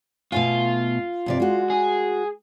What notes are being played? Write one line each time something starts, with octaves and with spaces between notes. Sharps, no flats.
B2 A3 F4 G#5
G2 C3 D5
G#3 F#4
G#4